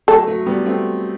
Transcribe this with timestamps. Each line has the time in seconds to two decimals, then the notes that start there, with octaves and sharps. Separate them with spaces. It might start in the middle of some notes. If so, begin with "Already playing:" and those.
0.08 F#3 A3 A4
0.27 F#3 A3
0.46 G3 B3
0.66 A3 C4